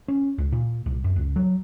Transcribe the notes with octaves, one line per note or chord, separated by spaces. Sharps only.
C#4
C#2
A#2
C2
F#2
C#2
F#3